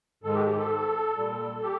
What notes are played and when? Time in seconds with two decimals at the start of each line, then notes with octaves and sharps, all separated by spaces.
0.23 G#2 D#3 G#3 A4
0.35 G4
0.46 G4
0.58 A4
1.16 A#2 G3
1.62 G4